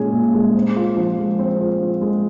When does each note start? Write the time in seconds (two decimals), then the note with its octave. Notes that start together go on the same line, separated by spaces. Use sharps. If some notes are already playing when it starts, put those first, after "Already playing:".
Already playing: A#2 G#3 C#4 G#4
0.12 A#2
0.34 G#3
0.55 C4
0.76 F4
0.97 F3
1.18 G#3
1.39 C4
1.60 F4
1.81 F3
2.01 G#3